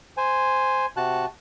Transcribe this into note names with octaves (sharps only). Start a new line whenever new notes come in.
C5 G#5
C3 F#4 A5 F#6